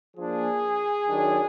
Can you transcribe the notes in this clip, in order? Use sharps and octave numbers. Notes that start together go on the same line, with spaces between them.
F3 A#3 D4 G#4
D#3 F#3 D4